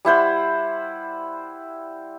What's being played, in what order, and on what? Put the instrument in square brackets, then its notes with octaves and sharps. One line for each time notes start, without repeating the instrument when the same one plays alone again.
[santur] G3 E4 C5 F#5